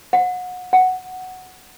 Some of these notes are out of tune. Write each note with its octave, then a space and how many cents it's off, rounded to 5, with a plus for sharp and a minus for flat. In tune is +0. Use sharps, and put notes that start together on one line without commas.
F#5 -25
F#5 +0